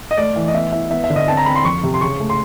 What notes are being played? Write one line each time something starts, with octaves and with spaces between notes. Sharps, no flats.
D#5
A3 D5
E3
D#5
B3 E5
E4 E5
B3 E5
E5
D3
D#5
C4 A5
A#5
C4 B5
C6
F2 C#6
C3
C6
C#3 C#6
A3
C6